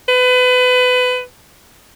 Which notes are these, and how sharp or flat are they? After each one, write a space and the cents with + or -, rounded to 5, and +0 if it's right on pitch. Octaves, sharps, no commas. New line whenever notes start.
B4 +25